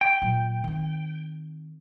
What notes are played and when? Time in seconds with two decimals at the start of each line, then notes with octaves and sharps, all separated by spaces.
0.01 G5
0.22 A#2 F#3
0.64 D#3 C4